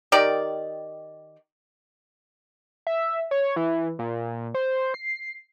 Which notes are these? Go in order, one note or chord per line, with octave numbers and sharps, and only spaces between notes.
D#3 G4 A#4 D5
E5
C#5
E3
A#2
C5
C7